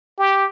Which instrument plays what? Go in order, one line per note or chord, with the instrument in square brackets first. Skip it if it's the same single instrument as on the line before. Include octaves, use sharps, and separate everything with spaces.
[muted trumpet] G4